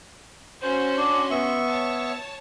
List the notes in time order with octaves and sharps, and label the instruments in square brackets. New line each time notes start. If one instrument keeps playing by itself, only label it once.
[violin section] C#4 F#4 C6 [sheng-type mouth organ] C5
[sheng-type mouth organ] D4
B3 E5 C#6
[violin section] C#5 A5